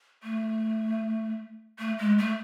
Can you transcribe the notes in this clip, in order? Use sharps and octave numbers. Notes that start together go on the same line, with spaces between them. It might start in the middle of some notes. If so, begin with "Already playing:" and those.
A3
A3
G#3
A3